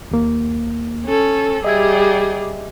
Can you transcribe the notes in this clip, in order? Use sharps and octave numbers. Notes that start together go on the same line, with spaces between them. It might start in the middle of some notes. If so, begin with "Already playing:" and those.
D#2 A#3
C#4 A4
G3 G#4 D#5 E5 G#6